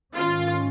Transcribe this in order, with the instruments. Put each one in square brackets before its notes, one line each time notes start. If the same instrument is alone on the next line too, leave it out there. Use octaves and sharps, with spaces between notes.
[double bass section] G#2 D#3 C#4 [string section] F4